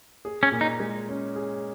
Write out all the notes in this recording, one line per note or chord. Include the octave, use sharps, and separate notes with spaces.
G#4
C#4
A#2
D#4
G#3
C#4
G#4